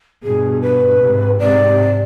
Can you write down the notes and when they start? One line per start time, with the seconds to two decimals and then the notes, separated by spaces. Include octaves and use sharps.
0.23 G2 B2 G#4
0.62 B4
1.00 G#2 C3
1.39 G#2 C3 D5